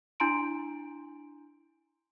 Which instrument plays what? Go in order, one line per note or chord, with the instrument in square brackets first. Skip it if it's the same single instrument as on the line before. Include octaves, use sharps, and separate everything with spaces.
[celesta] D4 E4 G#5 A#5 C6 D7